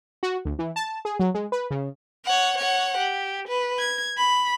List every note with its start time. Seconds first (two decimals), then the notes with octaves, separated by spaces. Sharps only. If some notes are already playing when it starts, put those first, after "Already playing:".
0.23 F#4
0.45 D2
0.59 E3
0.76 A5
1.05 G#4
1.19 F#3
1.34 G#3
1.52 B4
1.71 C#3
2.25 C#5 F#5
2.58 C#5 F#5
2.97 G4
3.48 B4
3.79 G#6
4.17 B5